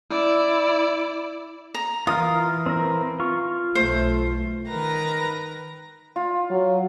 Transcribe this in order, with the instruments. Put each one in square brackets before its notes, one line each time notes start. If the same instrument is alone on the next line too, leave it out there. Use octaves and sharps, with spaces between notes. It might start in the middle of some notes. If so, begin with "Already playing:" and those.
[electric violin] E4 D5
[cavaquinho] A#5
[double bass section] E3 [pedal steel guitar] F4 A#4 F5 [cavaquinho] D#6
[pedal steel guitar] C4 A#4
F4 C#6
[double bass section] B1 A3 [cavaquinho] C5
[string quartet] D#3 A#4 B4 A#5 A#6
[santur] F4
[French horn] F#3